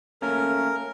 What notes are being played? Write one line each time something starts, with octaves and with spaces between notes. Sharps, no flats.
A3 A#3 C#4 A#4